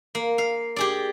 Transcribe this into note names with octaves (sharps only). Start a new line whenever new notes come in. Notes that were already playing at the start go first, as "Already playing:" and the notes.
A#3
F5
G4 G#4 D5